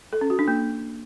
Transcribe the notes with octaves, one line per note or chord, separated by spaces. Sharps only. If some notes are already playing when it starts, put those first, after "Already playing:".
A4
C#4
F#4
D4
A#3